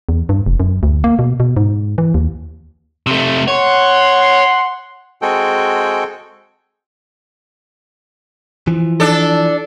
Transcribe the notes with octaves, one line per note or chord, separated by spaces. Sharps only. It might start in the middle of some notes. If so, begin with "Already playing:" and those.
E2
G2
F1
F#2
D2
A#3
B2
B2
G#2
E3
D#2
C3 A3
C#5 F#5 C6
G#3 C4 F#4 G#4 A4 G5
E3 F3
D4 A4